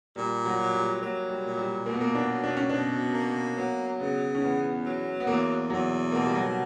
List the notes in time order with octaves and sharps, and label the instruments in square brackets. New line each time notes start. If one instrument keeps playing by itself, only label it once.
[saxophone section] A#2 [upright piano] G3
[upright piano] F#3
[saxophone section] F#3
[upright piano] G3
[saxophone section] F#3 [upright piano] A#3
[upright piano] G3
[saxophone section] A#2
[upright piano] G3
[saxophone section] B2 [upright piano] A#3
[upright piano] B3
A#3
D4
[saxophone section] F#3
[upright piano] D4
C#4
[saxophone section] B2 [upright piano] D4
[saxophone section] A#3
[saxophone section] F#3 [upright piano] B3
[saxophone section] C#3 [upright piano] B3
[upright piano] C#4
[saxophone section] E2 [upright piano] B3
[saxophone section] F#3
[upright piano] B3
[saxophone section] E2 [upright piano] A#3
[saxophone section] E2 [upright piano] F#3
[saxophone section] B2 [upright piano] A#3
[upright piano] G3
F#3
G3